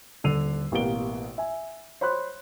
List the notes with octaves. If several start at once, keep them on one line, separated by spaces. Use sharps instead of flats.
D#1 D3 E6 C7 D#7 F7
A1 B2 A#3 G4 D7 G7
E5 G#5
C5 C#5 B5 C6 F#6